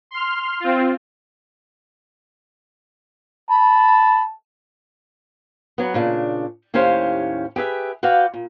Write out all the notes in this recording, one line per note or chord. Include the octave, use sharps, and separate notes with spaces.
C6 F6
C4 F4
A5 B5
F#3 B3
A#2 C#3 D4
D#2 A2 C#4 G4 C5 F5
G4 G#4 B4 E5
F#4 B4 D5 F5 G5
A#2